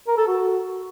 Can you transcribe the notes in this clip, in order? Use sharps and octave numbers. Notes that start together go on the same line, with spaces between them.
A#4
A4
F#4